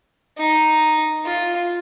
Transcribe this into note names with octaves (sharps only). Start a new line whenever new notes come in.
D#4
F4